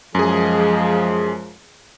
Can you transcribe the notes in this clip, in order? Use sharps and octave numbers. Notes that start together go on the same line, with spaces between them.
F#2 F3 G#3 G#4